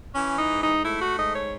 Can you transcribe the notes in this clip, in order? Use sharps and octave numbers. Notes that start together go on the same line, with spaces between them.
E3 C#4
D#4
G#2
D#4
A3 E4
F#4
G#2 D#5
C#5